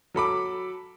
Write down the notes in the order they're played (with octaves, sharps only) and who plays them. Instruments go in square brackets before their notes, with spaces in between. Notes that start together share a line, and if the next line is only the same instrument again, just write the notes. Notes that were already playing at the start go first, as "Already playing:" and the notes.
[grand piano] F#3 A4 B5 D6